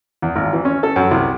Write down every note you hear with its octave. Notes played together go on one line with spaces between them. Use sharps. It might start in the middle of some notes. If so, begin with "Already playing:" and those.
E2
G#1
E3
C#4
A4
F#2
C2